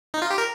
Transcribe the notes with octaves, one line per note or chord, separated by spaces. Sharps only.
D#4
F4
G4
A#4